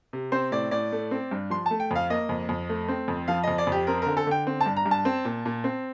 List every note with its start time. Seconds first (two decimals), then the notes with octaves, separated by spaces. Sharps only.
0.13 C3
0.32 C4 C5
0.52 A2 D5
0.71 A2 D5
0.92 A3
1.11 C4
1.31 G2
1.50 F3 C6
1.66 A3 A5
1.80 G5
1.91 F2 F5
2.10 A#3 D#5
2.29 F2
2.49 F2
2.69 A3
2.88 C4
3.08 F2
3.28 F3 F5
3.44 F2 D#5
3.58 D5
3.67 F2 G4
3.87 C4 A#4
4.02 D3 A#4
4.17 A4
4.27 D3 G5
4.47 C4
4.61 A5
4.66 G2
4.77 A#5
4.86 G2
4.91 A5
5.05 C4
5.25 A#2
5.46 A#2
5.64 C4